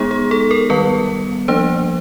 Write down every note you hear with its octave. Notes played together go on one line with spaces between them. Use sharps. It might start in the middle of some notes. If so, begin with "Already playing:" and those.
Already playing: G#3 B3 D#4 G#4
G#4
A4
A#4
D#3 G3 B3 B4
F3 A#3 D4 C5